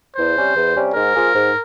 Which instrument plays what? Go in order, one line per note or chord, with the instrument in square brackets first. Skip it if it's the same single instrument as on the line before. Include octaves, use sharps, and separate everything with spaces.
[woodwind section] E2 [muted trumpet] C5
[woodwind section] C3 G3 C#4 G4
E2
C3 G3 C#4 G4
[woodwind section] G#2 [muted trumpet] A#4
[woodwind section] F3 A#3 F4 G#4
G#2